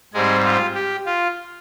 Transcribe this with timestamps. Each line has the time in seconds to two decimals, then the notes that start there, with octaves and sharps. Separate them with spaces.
0.13 G#2 G3 G#3 C4 G#4
0.44 F4
0.75 G4
1.06 F4